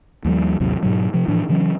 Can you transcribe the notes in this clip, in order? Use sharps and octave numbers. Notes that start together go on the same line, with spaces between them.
D#2 F3 G3
A1 D#2 C3 F#3
G#2 B2 F#3
C3 F3
A2 E3 F3 D4
C#3 E3 F#3 C#4